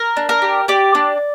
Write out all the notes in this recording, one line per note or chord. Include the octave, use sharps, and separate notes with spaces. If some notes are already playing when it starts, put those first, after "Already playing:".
Already playing: A#4
D4
A#4
G4
G4 D5
D4